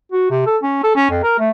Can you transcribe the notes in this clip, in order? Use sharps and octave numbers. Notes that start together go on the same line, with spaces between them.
F#4
C3
A4
C#4
A4
C#4
F2
A#4
A3